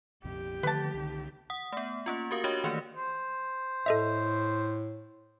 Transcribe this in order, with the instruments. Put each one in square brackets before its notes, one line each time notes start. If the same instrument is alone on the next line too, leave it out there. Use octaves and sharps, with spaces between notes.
[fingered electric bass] A#1 F2 C3 [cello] G4
[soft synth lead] D3 [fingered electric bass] D#3 F3 A3 [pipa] B4 A5
[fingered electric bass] C2 D#3
[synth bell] F#5 D#6
A3 B3
A#3 C#4 F4
F#4 G4 A#4 F5 D#6
D4 F#4 G4 C#5 D#5
D#3 E3 A3 A#3 D5 C#7
[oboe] C5
[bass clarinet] A2 [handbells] A4 D#5 E5